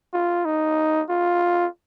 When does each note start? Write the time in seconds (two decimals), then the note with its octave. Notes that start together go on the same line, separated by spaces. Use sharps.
0.13 F4
0.45 D#4
1.09 F4